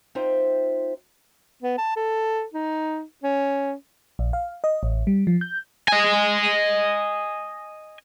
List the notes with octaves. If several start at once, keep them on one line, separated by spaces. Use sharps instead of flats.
C4 D#4 F4 C5 E5 G5
B3
A5
A4
D#4
C#4
A#1
F5
D#5
A1
G3
F3
G6
D#5 G#5